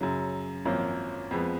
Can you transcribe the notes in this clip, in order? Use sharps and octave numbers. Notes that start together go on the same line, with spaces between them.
F#2 C#3 F#3
G#1 F#2 F3 A#3 C#4
F2 F3 G#3 B3